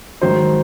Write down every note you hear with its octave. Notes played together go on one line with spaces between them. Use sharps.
G#2 D#3 F#3 C5